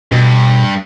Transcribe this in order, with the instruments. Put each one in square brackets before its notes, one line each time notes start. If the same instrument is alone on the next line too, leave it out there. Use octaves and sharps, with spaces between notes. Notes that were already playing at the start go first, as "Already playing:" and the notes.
[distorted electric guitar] G2 [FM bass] B2